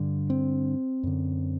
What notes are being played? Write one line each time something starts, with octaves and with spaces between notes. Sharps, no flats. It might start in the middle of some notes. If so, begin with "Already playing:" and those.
Already playing: G2 D3
C4
F#2 D3